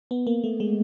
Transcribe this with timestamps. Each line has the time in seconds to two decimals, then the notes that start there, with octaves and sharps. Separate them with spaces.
0.11 B3
0.27 A#3
0.44 A3
0.60 G#3